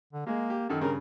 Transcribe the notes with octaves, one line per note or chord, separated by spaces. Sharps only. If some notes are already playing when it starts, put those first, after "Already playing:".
D3
G#3 A#3 G#4
G4
F#2 D#3 A4
G2 C#3 A#4